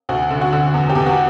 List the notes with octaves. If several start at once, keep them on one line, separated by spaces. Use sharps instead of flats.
D2 F#4
D3
F#4
D3
E2
G4
E2
F#4